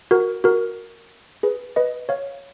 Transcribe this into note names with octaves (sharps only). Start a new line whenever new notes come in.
F#4 A#4
F#4 A#4
G#4 B4
B4 D#5
C#5 F5